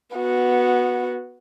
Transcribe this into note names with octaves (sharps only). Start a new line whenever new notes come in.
B3 F#4